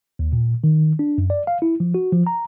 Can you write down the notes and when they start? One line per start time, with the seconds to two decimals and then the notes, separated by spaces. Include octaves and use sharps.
0.19 D#2
0.33 A#2
0.64 D#3
0.99 D4
1.18 F#2
1.30 D5
1.47 F5
1.62 E4
1.80 F3
1.94 F#4
2.12 F3
2.27 A#5